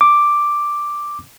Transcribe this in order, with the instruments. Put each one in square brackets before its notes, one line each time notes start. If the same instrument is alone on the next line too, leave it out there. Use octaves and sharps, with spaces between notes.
[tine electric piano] D6